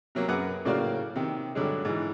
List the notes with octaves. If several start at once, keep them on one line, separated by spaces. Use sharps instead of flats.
C3 F#3 A#3
F#2 G#4 A#4 B4 F#5 D6
A2 C#3 A#3 F#4 D5 F5
C3 D#3
G2 D3 F#3 G#3
G#2 E3